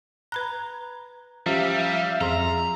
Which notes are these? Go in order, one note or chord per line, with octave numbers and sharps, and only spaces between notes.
B4 A#5 B5 F#6
F3 G3 C#4 G4 E5 F5
F2 G#4 A#5 C6